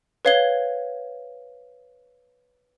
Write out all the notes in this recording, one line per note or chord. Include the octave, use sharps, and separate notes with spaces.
B4 C#5 F5 G#6 G7